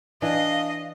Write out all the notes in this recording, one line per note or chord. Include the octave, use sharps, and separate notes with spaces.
E3 D4 D#5 F5